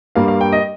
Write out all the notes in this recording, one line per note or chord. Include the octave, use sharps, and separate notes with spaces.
G2 G3 A#3 F5
F5
G5
D#5